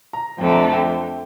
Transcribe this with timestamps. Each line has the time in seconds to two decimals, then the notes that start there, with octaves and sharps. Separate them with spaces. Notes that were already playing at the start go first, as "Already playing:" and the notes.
0.13 A#5
0.38 F2 D3 A3 G5
0.50 A#5
0.55 A5
0.72 G5